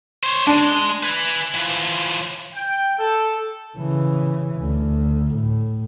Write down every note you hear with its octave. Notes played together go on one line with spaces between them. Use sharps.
C5 C#5
G#3 D4
B4 G#5
E3 F3
G5
A4
C#3 E3
D2
A2